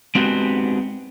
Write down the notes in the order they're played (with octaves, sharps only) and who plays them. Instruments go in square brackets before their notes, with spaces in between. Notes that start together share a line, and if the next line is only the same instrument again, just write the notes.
[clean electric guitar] G#3 B3 C4 D4 F#4 G4